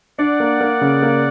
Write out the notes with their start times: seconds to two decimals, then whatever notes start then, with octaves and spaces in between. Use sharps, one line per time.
0.18 D4 D5 F#5
0.40 A#3
0.60 A#3
0.81 C#3
1.03 A#3